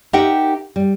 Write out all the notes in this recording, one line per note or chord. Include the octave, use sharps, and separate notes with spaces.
D#4 G4 A#4 E5 F#5 G5
G3